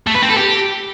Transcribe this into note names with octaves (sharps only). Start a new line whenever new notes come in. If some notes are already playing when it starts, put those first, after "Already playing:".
A3
B4
C4
A4
G4